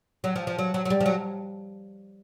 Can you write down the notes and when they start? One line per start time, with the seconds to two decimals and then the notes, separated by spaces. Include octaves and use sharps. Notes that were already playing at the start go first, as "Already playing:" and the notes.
0.24 F#3
0.36 F3
0.47 F3
0.58 F#3
0.74 F#3
0.85 F#3
0.90 G3
1.00 F3
1.06 F#3